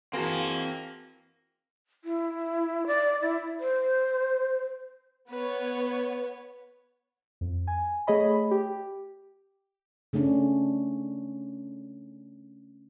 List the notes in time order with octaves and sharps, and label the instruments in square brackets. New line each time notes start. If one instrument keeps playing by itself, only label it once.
[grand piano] E3 F#4 G#4 [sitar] A#3 [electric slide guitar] C4 A5
[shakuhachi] E4
D5
E4
C5
[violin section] B3 C#5 [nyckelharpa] B4
[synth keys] F2
G#5
A3 G#4 C#5 D#5 B5
G4
[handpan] C#3 A3 C#4 D4